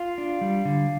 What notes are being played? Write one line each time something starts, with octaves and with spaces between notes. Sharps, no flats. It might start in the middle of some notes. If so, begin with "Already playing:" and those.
Already playing: F4 F5
D4
G3
D3